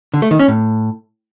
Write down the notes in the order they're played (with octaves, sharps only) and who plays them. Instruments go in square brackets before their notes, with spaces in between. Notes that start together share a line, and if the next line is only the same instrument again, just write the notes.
[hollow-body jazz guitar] D3
A3
D#3
C#4
A2